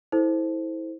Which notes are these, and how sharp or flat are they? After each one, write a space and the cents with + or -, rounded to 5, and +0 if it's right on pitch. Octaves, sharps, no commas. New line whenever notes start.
E4 -25 A4 -5 C5 +0